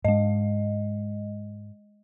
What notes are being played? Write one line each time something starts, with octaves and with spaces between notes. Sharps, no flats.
G#2 G#3 D#5